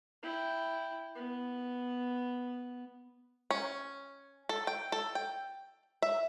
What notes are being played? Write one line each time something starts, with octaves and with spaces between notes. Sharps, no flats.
E4 G5
B3
C#4
A4
G5
A4
G5
E5